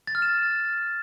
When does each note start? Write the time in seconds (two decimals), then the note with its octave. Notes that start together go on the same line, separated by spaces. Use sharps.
0.07 A6
0.15 F6
0.22 E7